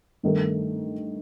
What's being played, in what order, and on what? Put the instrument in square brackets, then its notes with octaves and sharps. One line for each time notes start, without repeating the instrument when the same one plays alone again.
[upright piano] G2 D#3 A3 D#4 A#4